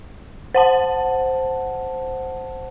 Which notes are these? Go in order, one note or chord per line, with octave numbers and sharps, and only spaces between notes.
C5 F#5 A5